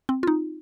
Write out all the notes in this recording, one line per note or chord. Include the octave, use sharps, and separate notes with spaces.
C4
F4
D#4